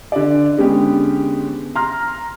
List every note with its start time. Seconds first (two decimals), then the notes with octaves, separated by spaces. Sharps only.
0.12 D3 D5
0.58 D3 G#3 B3 C#4 G4
1.75 A#5 C6 F6